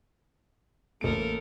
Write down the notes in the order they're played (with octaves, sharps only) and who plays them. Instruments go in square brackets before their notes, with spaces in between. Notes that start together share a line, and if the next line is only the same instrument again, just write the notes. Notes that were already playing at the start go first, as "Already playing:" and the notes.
[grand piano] A1 D7 [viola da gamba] A#3 A4 A#4